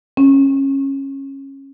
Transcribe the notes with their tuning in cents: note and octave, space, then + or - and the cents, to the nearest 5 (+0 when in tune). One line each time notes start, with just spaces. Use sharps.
C#4 -20